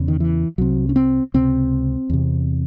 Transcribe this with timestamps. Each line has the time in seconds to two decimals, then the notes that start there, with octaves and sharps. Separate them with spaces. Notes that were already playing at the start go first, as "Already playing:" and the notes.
Already playing: E2 C#3
0.08 D#3
0.20 E3
0.58 C2 C3 F#3
0.89 C#4
0.96 C4
1.34 C#2 C3 C4
2.10 E2 C3